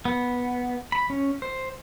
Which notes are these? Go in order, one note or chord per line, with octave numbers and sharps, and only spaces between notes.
B3
B5
C#4
C5